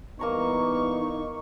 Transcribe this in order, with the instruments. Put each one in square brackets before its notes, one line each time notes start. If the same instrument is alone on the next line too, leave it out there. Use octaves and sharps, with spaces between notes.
[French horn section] E3 G3 B3 [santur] A#3 A#5 C6 [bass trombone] D#4 [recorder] C#6